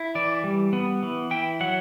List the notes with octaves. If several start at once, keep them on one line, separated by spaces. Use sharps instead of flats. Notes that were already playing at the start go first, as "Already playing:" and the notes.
Already playing: E4
E3 D5
G3
B3
E3
E4 G5
F#3 F#5